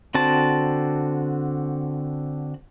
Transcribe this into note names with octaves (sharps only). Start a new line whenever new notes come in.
D3 C4 F#4 A5